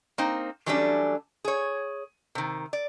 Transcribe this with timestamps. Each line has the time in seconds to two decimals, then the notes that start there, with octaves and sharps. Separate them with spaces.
0.18 A#3 C4 D#4
0.66 E3 F#3 G3 A3 C#4 D4
1.44 G#4 C#5
2.35 C3 D#3
2.73 D5